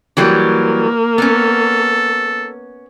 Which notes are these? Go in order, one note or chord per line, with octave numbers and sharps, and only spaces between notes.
E3 F#3 G3 A#3
B3 C#4 A4